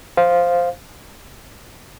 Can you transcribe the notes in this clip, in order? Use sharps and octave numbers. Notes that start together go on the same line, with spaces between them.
C5 F5